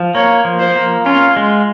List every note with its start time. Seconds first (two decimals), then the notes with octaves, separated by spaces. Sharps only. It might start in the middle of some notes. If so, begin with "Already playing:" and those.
Already playing: F3
0.15 A#3 C#5
0.45 F3
0.59 C5
0.76 A#3
1.05 C#4 F4
1.36 G#3